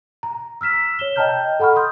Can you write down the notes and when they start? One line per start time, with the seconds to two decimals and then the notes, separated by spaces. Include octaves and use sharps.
0.23 A#5
0.61 E6 F6 B6 E7
0.99 C#5 E7 G7
1.16 D#5 G5 A5 A#5 F6 G6
1.60 A4 F#5 B5 C#6 F6
1.76 C6 D#6 G6